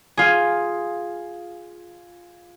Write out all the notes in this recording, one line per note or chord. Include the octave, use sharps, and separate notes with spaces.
F4 G#4